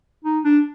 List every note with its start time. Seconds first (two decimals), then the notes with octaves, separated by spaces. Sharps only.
0.25 D#4
0.45 D4